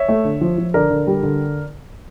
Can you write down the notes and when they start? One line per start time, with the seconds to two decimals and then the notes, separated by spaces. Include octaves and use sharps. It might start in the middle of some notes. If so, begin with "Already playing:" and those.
Already playing: C#5 E5
0.09 A3
0.25 D3
0.41 F3
0.58 F3
0.74 D3 A#4 D5
0.90 D3
1.07 G3
1.23 D3